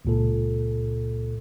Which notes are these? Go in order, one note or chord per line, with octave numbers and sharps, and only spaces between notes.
C#2 A#2 A4